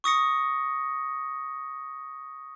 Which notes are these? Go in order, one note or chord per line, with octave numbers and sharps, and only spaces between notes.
C#6 D#6 A#6 C#7